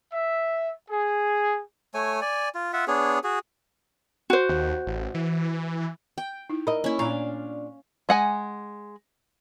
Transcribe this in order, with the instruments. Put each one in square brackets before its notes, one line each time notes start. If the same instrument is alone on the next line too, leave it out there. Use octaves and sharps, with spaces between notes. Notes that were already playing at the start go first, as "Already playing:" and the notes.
[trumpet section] E5
G#4
[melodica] A3 C#5 G#5
D5 G#5
F4
F4 E5 F#5
B3 D4 G#4 C#5
F#4 G#4
[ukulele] F#4 C5
[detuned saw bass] D#2
A1
E3
[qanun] G5
[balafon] D#4 E4
[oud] A#4 D#5 [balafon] B5
[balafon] A#3 [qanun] C#4 E4
[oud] A#2 D4 [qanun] F5 [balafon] A#5 C#6
[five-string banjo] G#3 F#5 G#5